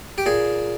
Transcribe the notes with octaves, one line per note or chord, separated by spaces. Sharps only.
G4
A#2 G#4